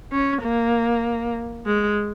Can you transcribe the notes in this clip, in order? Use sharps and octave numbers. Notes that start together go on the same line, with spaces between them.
C#4
A#3
G#3